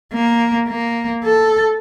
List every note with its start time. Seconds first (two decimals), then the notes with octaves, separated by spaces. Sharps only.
0.13 A#3
0.69 A#3
1.24 A4